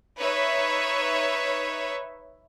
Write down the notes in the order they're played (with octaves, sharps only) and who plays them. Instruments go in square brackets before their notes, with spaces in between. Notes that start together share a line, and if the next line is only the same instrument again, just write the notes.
[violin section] D#4 B4 C#5 E5